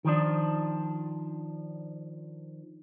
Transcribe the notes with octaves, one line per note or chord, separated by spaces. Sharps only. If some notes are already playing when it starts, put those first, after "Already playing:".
D#3 F3 D4